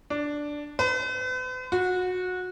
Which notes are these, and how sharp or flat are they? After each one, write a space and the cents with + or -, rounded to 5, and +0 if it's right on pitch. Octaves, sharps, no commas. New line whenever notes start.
D4 +0
B4 +45
F#4 -20